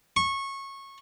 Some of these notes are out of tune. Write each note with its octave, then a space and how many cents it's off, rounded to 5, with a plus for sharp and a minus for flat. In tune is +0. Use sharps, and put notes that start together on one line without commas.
C#6 -20